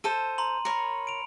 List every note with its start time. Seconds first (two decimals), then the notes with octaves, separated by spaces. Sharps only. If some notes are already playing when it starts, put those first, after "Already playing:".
0.04 A4 C5 D#7
0.38 A#5 C6 F#7
0.65 A#4 C#5 B5 C#7
1.07 D7 F7